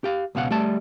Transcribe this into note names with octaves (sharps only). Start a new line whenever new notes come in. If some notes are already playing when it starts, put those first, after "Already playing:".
G4 F5
C#2 B2 F5 F#5
G3 A3 D5 A5